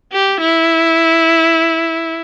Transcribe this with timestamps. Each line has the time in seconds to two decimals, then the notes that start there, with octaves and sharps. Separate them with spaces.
0.12 G4
0.40 E4